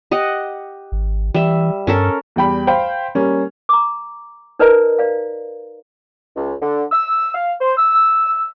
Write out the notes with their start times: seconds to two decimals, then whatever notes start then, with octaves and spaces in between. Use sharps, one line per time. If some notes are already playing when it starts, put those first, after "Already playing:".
0.11 G4 D#5 F#5
0.92 G#1
1.34 E3 G3 E5
1.87 G2 C#4 A4 A#4
2.36 E2 G3 G5 B5
2.67 C5 F5 G5 B5
3.15 G3 A#3 C#4
3.69 A#5 D6
4.59 D#4 A#4 B4 D5 D#5 A#5
4.99 D5 F5
6.36 C#2
6.62 D3
6.92 E6
7.35 F5
7.60 C5
7.78 E6